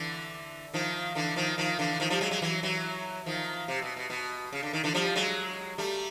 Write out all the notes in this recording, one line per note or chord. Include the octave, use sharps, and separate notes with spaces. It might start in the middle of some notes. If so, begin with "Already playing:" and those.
Already playing: D3 E3
D#3 F3
D3 E3
D#3 F3
D#3 F3
D3 E3
D#3 F3
F3 G3
F#3 G#3
F#3 G#3
E3 F#3
E3 F#3
D#3 F3
C3
B2
B2
B2
C#3
D3
D#3
D3 E3
F3 G3
F#3 G#3
G3 A3